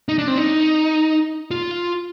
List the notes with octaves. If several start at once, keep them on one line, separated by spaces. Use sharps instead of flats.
D#4
D4
C4
D#4
F4